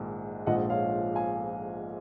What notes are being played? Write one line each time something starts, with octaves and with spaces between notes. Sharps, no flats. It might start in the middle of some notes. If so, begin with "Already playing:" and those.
Already playing: A#1 G#2 D#3
A#1 G#2 F3 D#5 F#5
C#5 F5
F5 G#5